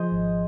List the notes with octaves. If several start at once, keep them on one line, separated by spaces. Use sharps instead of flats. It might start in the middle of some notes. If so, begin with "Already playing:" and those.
Already playing: F3 G#4 C5 D#5
G#1